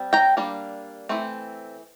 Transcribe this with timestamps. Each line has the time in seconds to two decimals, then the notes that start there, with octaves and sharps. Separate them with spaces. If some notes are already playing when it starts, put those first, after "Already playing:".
Already playing: G3 C4
0.13 G5 A#5
0.37 G3 A#3 D4
1.09 E3 A3 C4